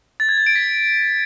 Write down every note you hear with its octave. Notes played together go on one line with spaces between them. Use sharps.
A6
G#6
A6
D7
B6